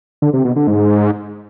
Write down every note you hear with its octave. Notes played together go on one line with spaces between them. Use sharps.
D3
C3
B2
D3
G#2